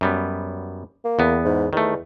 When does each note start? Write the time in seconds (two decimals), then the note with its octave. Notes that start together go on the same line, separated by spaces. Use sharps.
0.01 F#2 G3 B3
1.04 A#3
1.19 E2 B3
1.45 G#2
1.73 E2 D#3 A3